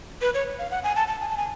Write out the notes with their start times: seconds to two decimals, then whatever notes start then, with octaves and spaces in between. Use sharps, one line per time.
0.21 B4
0.34 C#5
0.59 F5
0.71 F#5
0.84 G#5
0.96 A5
1.08 A5
1.21 G#5
1.29 A5
1.37 G#5